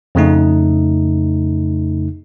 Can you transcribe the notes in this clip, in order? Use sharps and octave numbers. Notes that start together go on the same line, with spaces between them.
F2 C#3 A3 D#4